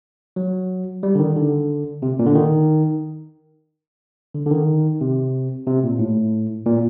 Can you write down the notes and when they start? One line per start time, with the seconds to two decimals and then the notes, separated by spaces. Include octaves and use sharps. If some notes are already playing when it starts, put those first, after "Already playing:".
0.36 F#3
1.03 G3
1.15 D3
1.19 D#3
1.36 D3
2.02 C3
2.19 A#2
2.27 D3
2.35 D#3
4.34 D3
4.46 D3
4.51 D#3
5.01 C3
5.67 C3
5.84 A#2
5.99 A2
6.66 A#2